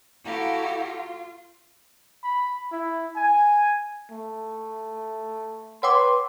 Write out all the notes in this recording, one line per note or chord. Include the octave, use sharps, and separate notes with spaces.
E4 F#4 G4 A4 F5 A#5
F4
B5
E4
G#5
A3
B4 C#5 F#5 G5 C6 D6 E6